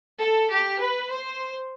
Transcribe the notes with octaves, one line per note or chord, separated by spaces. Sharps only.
A4
G4
B4
C5